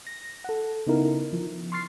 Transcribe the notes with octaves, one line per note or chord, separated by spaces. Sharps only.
A#6
A4 F#5
C#3 B3 D#4 E4 A#4
F3
C6 C#6 F6 A6 C7